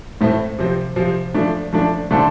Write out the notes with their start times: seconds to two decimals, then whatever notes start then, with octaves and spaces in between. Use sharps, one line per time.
0.21 A2 A3 C4
0.59 C3 F3 C4
0.96 C3 F3 C4
1.34 F3 A3 D4
1.73 F3 A3 D4
2.11 D3 A3 D4 A4 C5